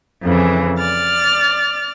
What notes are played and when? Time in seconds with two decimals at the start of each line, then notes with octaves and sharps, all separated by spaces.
0.23 F2 C#3 E3
0.79 D5 F6 A6